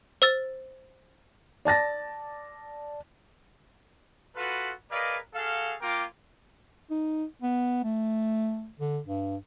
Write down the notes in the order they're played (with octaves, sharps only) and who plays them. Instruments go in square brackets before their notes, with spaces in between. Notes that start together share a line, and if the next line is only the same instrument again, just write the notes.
[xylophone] C5 E6 A6
[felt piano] D5 A5 A6 A#6
[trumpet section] F4 F#4 A4 B4
G#4 A#4 B4 D5 D#5 F5
F#4 G#4 A4 F5
A#3 F4 A#4 G5 D6
[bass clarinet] D#4
B3
A3
D3
G2